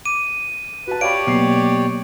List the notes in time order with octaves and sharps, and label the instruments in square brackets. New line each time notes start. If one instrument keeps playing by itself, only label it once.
[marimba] D6 [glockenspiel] D#7
[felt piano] F#4 A5 [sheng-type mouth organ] B4
[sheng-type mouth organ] G4 C#5 D5 [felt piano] F5 B5 [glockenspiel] D7
[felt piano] B2 C7 [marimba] F#3 A#3